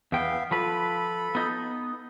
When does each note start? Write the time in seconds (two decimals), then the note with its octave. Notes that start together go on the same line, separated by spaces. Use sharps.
0.12 E2 B3 E5 F5 G5
0.51 F3 A4 B4 B5
1.35 B3 D#4